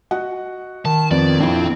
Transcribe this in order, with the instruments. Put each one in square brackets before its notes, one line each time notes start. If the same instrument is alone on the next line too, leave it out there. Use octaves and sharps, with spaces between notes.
[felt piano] F#4 D#5 F#5
[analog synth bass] D#3 [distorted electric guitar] A5
[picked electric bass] F2 [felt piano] B3 [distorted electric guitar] D5
[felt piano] A#1 E4 [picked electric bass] F2 [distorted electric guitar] C4